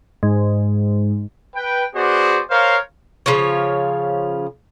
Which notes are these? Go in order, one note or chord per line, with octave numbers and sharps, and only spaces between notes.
G#2
B4 G5
B3 F#4 G#4 C5 D5
A#4 C5 C#5 F5
C#3 F3 F4 C#5